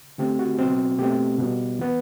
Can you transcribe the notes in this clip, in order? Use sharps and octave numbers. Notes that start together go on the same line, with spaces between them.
D3 A3 C4 G4
F#4
B2 F#3 C4
B2 A3 C4 G4
B2 G3 B3
E3 B3